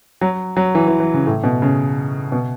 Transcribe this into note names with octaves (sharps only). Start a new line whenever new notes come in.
F#3
F#3
E3
E3
E3
C#3
A2
B2
C#3
B2